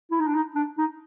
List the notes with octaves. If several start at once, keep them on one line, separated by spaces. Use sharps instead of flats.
E4
D#4
D4
D#4
D4
D#4